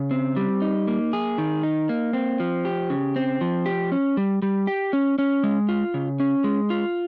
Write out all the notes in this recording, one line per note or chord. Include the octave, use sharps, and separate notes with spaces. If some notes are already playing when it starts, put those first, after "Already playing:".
Already playing: C#3
C4
G3
D#4
A#3
G#4
D#3
D#4
A#3
C4
F3
G4
C#3
C4
F3
G4
C#4
G3
G3
G4
C#4
C#4
G#3
F4
C#3
C#4
G#3
F4